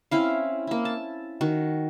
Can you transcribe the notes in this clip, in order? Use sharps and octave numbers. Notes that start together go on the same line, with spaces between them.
C4 C#4 E4 F5
A#3 E4
A5
D#3 F#4